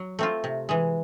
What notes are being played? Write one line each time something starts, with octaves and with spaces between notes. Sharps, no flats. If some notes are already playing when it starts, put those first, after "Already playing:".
Already playing: F#3
A3 C4 F4
C3
E3 G#3